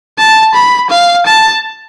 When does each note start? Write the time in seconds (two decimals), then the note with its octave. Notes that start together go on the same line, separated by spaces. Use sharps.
0.18 A5
0.54 B5
0.90 F5
1.26 A5